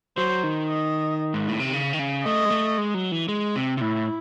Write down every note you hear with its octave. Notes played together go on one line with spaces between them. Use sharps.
F#3 C5
D#3
D#5
G#2
A2
C3
C#3
D#3
C#3
A3 D#5
G#3
A3
G#3
F#3
E3
G#3
C3
C3
A2 E4